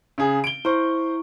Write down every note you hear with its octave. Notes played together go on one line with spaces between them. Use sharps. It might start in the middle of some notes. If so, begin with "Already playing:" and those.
C#3 G#4
D7 G7
E4 C5 C#6